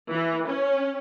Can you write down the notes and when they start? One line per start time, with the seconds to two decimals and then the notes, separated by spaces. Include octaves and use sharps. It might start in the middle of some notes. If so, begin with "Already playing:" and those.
0.12 E3
0.48 C#4